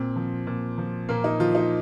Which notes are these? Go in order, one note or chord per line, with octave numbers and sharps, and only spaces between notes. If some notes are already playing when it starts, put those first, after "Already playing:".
Already playing: A#2 C4
F3
A#2
F3
A#2 A#3
D#4
F3 F4
D#4